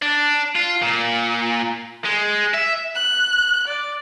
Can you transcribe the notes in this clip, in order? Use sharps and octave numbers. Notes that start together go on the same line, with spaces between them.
D4
F4
A#2
G#3
E5
F#6
D5